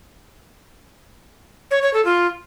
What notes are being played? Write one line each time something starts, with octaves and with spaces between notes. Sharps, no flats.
C#5
C#5
A4
F4